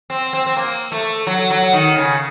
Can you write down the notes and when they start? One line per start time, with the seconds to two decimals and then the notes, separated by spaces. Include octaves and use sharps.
0.10 C4
0.33 C4
0.46 C4
0.56 A#3
0.92 A3
1.27 F#3
1.50 F#3
1.73 D#3
1.97 C#3